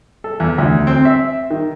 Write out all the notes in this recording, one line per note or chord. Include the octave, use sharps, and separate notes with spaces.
A4
E2
D2
C4
E5
D#3